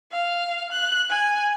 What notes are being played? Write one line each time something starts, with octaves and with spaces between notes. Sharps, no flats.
F5
F#6
G#5